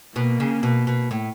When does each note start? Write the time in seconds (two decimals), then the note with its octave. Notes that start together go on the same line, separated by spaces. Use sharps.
0.16 B2 A#3
0.40 C#3
0.63 B2
0.87 B2
1.11 A2